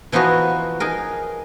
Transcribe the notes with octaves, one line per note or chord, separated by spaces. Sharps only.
E3 F3 B3 D#4 F#4
D#4 G#4 A#4